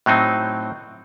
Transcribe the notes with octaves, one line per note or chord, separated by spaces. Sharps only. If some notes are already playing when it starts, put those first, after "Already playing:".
A2 F#3 C4 D#4